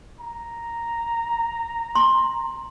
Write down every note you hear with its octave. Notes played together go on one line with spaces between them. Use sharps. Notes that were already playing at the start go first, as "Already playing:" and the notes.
A#5
C6